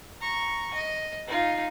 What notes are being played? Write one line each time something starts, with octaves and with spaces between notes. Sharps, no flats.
A#5 C#6
D#5
D#4 F4